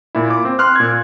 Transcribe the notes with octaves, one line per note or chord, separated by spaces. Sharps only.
A#2 E4
D6
C4
C6 F6 F#6
A#2 G#6